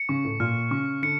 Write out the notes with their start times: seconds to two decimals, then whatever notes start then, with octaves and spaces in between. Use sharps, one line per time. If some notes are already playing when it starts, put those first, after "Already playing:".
Already playing: C#7
0.09 C#3 C#6
0.24 A2
0.40 A#2 F6
0.71 C#3 C#6
1.02 D3 C#7